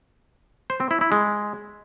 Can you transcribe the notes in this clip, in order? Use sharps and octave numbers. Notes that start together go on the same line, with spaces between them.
C5
C4
E4
E4
G#3